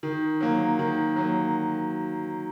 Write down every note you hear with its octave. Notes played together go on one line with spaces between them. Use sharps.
D#3
F#3 A#3
D#3
F#3 A#3